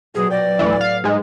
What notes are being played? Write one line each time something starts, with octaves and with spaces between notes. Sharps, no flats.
A#1 B2 F#3 G#4
D5 G5 A#6
D2 A2 E3 F#4
F5
G#2 G#3